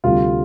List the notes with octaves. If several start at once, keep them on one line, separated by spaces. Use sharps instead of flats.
D2 C3 G3 F4